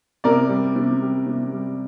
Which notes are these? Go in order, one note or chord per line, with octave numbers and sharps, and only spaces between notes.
C3 A#4 D5
G3
C3
G3
C3
G3